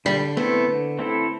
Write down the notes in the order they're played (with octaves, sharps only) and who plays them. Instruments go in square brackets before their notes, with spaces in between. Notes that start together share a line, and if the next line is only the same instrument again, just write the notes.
[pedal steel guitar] D3 [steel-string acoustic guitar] G3
[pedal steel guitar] A3 C4 E4 A4 [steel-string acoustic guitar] B3
[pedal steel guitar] D3
A3 C4 E4 A4